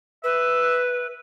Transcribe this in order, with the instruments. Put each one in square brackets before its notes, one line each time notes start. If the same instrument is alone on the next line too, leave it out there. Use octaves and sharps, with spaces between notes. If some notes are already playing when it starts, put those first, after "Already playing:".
[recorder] B4 [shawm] E5